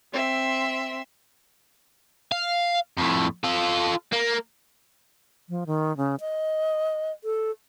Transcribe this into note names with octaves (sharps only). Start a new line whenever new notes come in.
C4 E5 C6
F5
F2 A2
F4 A4
A#3
F3
D#3
C#3
D#5
A4